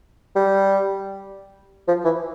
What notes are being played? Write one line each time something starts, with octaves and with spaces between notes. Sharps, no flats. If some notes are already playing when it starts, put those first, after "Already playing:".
G3
F3
E3